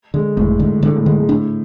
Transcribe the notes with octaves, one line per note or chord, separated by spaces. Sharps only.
D3 G#3
E1 A2
G#2 D3
A2 D3
A2
G#2 D3
G#2
A2 D4